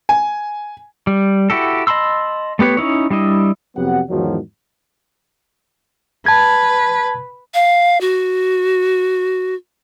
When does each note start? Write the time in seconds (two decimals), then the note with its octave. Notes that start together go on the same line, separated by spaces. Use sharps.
0.09 G#5
1.07 G3
1.50 E4 F#4 G4 A4
1.87 D#5 A5 B5 C6 E6
2.59 A3 B3 G4 B4 C#5
2.77 C#4 D#4 E4 C#5
3.10 G3 D4 E4 D#5
3.76 F2 C3 F#3 B3 G4 F#5
4.09 E2 G#2 D#3 F3 F#3
6.26 B4 A5 G#6
7.54 F5
8.01 F#4